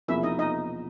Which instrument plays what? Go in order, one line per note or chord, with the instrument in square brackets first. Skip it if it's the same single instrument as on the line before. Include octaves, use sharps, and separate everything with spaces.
[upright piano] E1 E2 C3 F3 A#3 [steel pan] E4 E5
[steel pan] D#4 D#5
D#4 D#5